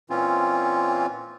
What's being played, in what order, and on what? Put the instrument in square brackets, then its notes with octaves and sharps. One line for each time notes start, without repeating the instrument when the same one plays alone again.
[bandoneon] A#2 E3 C4 C#4 F4